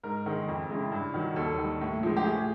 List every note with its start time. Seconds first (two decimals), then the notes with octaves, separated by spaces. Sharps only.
0.04 G#2 A#4
0.26 D#3 G#3
0.48 F2
0.70 C#3 E3 G#3
0.92 G2
1.14 D#3 F#3
1.36 D#2 A4
1.58 D#3 G3
1.81 A2
2.03 F3 G#3
2.17 G4
2.25 A2 G#4